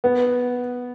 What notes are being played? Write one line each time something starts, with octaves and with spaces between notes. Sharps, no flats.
B3